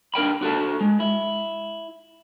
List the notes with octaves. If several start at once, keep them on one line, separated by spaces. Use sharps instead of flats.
D4 A#4 G5 B5
D4 F#4 A4 A5
G#3
E4